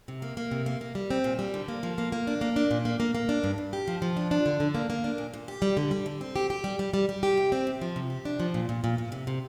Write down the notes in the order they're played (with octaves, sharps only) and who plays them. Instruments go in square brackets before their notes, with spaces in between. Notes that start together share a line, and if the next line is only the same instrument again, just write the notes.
[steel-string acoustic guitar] C3
A#3
A#3
C3
A#3
A#3
G3
C4
A#2
G3
D3
A#3
F3
A#3
A#3
D4
A#3
D4
A#2
A#3
A#3
A#3
D4
G2
G2
G4
F3
F3
D4
D4
D3
D3
A#3
A#3
D4
A#2
A#2
G4
G3
D3
G3
D3
C4
G4
G4
G3
G3
G3
G3
G4
C3
C4
C3
F3
C3
G4
D4
F3
A#2
A#2
A#2
A#2
C3
C3